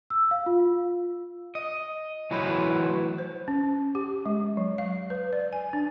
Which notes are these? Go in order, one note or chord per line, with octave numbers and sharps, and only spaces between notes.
E6
F5
F4
D#5
E3 F#3 A3 E4 B4 C5
C5
C#4
G4
G#3
F#3
F5
B4
D5
G#5
D4